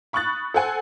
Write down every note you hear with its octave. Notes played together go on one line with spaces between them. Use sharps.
B5 C#6 D#6 F#6 A6
A4 C5 F#5 G#5